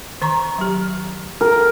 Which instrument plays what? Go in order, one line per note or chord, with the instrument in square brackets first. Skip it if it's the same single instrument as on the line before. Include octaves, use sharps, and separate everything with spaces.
[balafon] D#3 A#5 C#6
F#3 G4
[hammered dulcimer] A#4